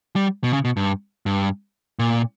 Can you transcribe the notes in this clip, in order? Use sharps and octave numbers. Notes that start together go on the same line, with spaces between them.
G3
B2
C#3
B2
G2
G2
A#2